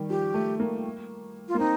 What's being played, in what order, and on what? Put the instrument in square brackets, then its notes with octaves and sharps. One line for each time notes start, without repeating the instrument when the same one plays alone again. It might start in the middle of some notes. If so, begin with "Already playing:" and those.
Already playing: [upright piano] D#3 G3
[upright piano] F3 [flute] G4
[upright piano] A3
A#3
[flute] F4
[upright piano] A#3
[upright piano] C4 [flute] D#4